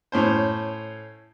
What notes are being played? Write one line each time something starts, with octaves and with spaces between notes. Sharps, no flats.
A2 C#4 C5